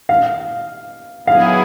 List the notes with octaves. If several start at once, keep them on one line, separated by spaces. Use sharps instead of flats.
F5
F#3 B3 E4 G#4 F5